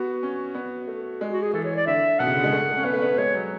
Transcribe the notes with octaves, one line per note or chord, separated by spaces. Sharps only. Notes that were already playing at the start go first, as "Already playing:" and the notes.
Already playing: B3 F#4
C#4
B3
A3
G#3
F#4
G#4
E3 A4
C#5
D5
D3 E5
B2 F#5
C#3
D3
G#3
A3
A3
C#4
B3 B4
A3
B3
G#3 C#5
F#3